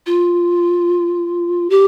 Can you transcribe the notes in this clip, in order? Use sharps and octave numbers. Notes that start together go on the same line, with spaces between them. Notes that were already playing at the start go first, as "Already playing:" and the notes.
F4
G4